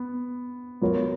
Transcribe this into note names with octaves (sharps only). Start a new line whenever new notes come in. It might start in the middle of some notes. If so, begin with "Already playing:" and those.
Already playing: B3
F#3 B3 F4 A#4 C#5